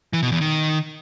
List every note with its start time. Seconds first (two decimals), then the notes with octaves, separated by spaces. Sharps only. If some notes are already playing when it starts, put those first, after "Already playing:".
0.13 E3
0.23 B2
0.32 E2
0.41 D#3